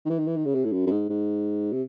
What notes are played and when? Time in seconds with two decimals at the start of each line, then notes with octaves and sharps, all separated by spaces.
0.06 D#3
0.10 E3
0.19 D#3
0.27 E3
0.36 D#3
0.45 C#3
0.55 C3
0.64 A2
0.72 F#2
0.86 F#2
0.91 G#2
1.09 G#2
1.72 C3